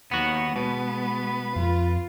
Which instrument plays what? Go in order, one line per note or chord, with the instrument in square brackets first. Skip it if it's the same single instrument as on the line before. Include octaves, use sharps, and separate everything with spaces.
[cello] D#2 D#3 [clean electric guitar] B3 F#4 [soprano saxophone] F#5
[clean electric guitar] B2 [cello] G#3 B3 [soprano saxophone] B4
[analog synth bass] F2 [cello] F4